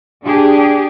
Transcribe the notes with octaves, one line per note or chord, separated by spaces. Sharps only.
D4 G4 G#4